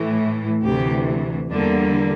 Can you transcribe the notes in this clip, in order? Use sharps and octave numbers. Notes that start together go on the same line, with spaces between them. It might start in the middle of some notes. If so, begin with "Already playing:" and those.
Already playing: A2 E3 A3
D2 C3 E3 G4
E2 D3 G3 A#3 D4